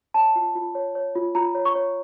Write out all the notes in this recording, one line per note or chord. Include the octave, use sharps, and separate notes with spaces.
C#5 A5
F4
F4
C#5
C#5
F4
F4 A#5
C#5
C#6
C#5